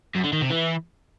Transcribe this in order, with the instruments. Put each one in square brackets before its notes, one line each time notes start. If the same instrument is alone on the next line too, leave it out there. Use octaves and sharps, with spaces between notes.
[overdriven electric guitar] F#2
D3
D#3
C3
E3